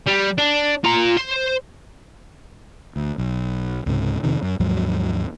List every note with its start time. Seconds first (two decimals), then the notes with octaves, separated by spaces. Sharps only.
0.06 G3
0.38 D4
0.84 F4 A#5
1.17 C5
2.96 D2
3.18 B1
3.86 C#2 G#2 C3
4.23 F2 C3 D#3
4.42 F#2
4.60 D#2 G#2 F3 F#3